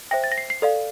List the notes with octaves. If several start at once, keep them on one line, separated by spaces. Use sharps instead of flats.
C5 E5 G5 A#6
A6
A#6
C7
C7
A4 D5 F5